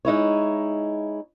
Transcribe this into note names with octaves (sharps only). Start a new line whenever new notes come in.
G#3 D#4 E4 C#5